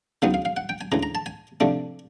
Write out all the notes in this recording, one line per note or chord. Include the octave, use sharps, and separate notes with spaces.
D2 C#3 F#3 B3 D#4 F5
F5
F5
F#5
G5
G#5
D2 C#3 E3 A#5
A#5
A5
G#5
C3 F3 A3 D4